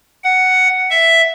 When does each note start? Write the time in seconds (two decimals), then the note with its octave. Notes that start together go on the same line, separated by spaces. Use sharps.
0.24 F#5
0.90 E5